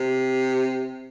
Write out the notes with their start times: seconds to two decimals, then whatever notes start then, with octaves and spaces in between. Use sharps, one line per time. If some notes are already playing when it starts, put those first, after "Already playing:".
Already playing: C3